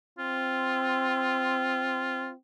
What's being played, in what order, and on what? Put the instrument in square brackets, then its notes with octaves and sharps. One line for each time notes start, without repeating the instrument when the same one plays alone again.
[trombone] C4 [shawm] F4